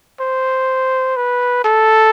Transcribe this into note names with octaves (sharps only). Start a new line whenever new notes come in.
C5
B4
A4